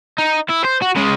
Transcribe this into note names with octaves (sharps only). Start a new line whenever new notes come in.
D#4
E4
C5
F#4
C#3 G#3